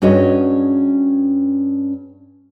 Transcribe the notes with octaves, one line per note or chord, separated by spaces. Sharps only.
G2 C#4 F#4 G#4 D#5